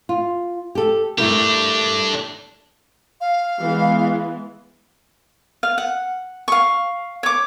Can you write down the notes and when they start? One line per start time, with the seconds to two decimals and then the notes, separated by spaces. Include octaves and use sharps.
0.09 F4
0.75 G4 A4
1.18 A3 D4 E4 G4 A#4
3.21 F5
3.58 E3 G#3 B3
5.63 F5
5.78 F#5
6.48 F5 C#6
7.23 C#5 D6